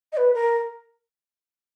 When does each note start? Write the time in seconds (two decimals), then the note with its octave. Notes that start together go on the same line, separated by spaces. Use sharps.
0.13 D#5
0.17 B4
0.34 A#4